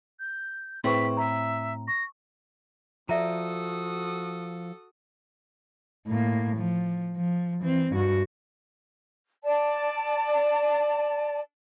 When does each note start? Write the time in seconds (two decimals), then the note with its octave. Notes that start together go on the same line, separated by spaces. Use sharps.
0.19 G6
0.84 A2 C4 E4 G#4 B4 C#6 B6
1.17 E5 A#5
1.88 C#6 A#6
3.09 F3 F#4 A4 D5 E5 A#5 D#6
6.07 A2 A#3
6.56 F3
7.17 F3
7.61 E3 C4
7.92 G2 F#4
9.44 D5 A5